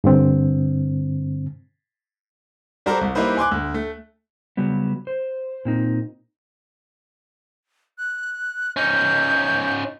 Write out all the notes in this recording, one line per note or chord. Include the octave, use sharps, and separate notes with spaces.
G2 D3 C4
G3 F#4 A4 A#4 C5 D5
C2
G3 A#3 D#4 E4 B4 C5
G#5 C6 D6 F#6
D2
A3
C#3 F#3 G3 B3
C5
A#2 C4 D#4
F#6
C#4 D#4 G6